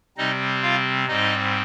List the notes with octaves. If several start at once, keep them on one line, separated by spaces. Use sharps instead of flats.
C3 G3 C4 D#4 D#5
F4 F5
G#2 G3 C4 D#4 D#5